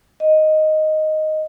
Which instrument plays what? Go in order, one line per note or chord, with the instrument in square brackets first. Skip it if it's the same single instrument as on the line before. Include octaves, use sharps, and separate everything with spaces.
[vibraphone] D#5